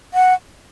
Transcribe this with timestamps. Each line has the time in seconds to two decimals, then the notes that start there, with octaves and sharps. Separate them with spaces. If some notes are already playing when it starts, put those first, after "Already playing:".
0.14 F#5